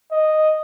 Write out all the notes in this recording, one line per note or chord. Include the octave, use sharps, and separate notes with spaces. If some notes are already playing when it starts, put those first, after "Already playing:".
D#5